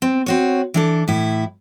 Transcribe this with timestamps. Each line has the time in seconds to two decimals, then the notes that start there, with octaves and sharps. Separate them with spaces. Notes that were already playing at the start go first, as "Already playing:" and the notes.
0.02 C4
0.26 C4 F#4 C#5
0.74 E3 D4 A4
1.08 A2 E4